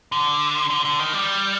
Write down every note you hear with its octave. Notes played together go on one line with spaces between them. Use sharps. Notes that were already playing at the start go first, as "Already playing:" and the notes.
D3
D3
D3
D#3
G3